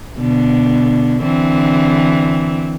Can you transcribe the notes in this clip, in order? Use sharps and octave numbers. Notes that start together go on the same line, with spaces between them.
B2 D3
D3 E3 C4